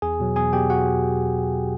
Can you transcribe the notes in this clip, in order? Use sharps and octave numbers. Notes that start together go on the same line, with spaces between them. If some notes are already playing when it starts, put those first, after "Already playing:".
E2 G#4 G#5
B2 F#3
E2 G#4 G#5
B2 F#3 G4 G5
F#4 F#5